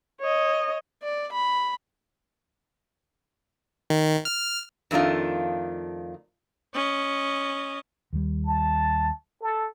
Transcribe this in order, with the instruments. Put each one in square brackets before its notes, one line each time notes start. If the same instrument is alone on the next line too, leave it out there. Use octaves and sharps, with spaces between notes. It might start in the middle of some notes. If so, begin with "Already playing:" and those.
[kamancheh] C#5 D#5
[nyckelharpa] D5
B5
[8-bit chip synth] D#3
F6
[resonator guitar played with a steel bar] F2 D#3 A3 D4 F4
[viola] C#4 D#5
[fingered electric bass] D#2 G3
[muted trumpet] A5
A4